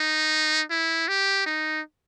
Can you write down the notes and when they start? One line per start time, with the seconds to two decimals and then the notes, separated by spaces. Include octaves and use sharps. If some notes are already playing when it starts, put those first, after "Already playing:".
Already playing: D#4
0.70 E4
1.08 G4
1.46 D#4